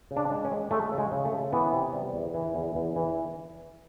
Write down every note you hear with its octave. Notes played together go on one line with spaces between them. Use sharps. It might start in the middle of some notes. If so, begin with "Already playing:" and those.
C#3
D4
G#3
C#4
G#3
G#3 A3
C#3
G#3
C#3
A3
C#3
E3 B3
C3
G3
E2
E3
E2
E2
E3